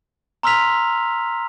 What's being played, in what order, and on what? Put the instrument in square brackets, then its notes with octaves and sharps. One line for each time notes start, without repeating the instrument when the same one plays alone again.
[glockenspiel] A#5 C6 E6 F6 B6 F7